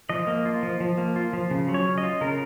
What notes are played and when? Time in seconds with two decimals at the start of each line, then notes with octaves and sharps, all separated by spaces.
0.09 F3 D#5
0.27 A#3
0.45 F4
0.63 F3
0.80 F3
0.98 A#3
1.16 F4
1.33 F3
1.51 C#3
1.68 F#3
1.74 C#5
1.86 C#4
1.98 D#5
2.04 F4
2.21 C#3 A#4